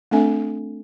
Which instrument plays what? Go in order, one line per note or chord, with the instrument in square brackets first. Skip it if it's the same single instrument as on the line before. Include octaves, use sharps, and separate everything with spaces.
[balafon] A3 C4 D4 A4 E5 G#5